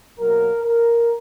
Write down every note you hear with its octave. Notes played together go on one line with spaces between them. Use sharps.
B2 F#3 A#3 A#4
A#4